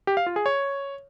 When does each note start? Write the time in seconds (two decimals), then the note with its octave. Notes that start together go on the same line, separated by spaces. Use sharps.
0.07 G4
0.17 F5
0.26 F4
0.36 G#4
0.46 C#5